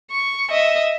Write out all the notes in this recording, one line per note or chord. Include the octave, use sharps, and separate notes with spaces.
C#6
D#5 E5